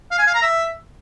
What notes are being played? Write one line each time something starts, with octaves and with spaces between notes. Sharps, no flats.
F5
G#5
F5
A#5
E5